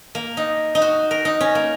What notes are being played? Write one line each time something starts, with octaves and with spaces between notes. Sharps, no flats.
A#3
D#4
D#4
F#4
A#4
D#4
C#4
A#3